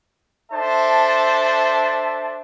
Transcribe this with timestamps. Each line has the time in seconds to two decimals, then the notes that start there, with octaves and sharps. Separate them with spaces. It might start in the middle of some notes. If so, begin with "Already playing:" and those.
0.52 D4 A4 C5 E5 A5